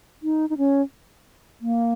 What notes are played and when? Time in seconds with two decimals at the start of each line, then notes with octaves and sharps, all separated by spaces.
0.23 D#4
0.50 D#4
0.58 C#4
1.61 A#3